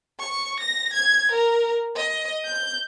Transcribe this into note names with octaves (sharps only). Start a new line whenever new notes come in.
C#6
A#6
G#6
A#4
D#5
G6